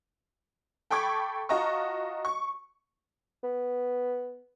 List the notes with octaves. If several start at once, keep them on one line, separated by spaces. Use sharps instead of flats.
A4 G5 B5 C#6 D6 G#6
F4 F#4 D#5 A5 A#5 C#6
C#6
B3